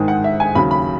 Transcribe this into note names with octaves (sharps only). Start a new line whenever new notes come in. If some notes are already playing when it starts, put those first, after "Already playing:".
Already playing: G#2 D#3 G#3
F#5
E5
G#5
D#2 C#3 F#3 B5
B5